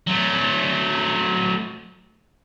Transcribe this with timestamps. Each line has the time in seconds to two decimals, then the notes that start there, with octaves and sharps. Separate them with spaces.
0.07 F#3 A3